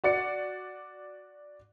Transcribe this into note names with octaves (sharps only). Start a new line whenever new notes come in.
F#4 D5 C#7